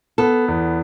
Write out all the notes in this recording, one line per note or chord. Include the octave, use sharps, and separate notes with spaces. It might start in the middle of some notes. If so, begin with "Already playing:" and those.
B3 A4
E2